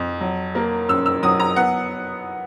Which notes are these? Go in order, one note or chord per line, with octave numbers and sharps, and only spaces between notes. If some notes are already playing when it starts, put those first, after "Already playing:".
Already playing: F2
F#3
A#3
F#2 E6
E6
F#3 D#6
A#5
B3 F#5